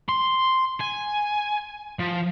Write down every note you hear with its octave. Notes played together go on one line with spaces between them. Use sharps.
C6
G#5
F3